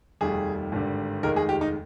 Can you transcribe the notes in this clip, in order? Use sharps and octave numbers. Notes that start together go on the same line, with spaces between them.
F1 D#2 D#3 G3 G#4
G#1 G2 D3 G3
F1 D#2 D#3 G#3 A#4
G#4
G4
D#4